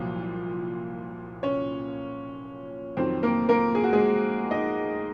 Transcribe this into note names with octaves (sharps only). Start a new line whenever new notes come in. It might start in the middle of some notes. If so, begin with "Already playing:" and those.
Already playing: C2 A#2 F3 F#3 F4
C#4 C#5
F2 D#3 F#3 C4 C5
A#3 A#4
A#3 A#4
G#4
F#4
G#3 G#4
D#4 D#5